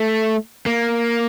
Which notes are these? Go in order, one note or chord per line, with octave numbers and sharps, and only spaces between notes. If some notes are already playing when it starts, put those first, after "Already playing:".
Already playing: A3
A#3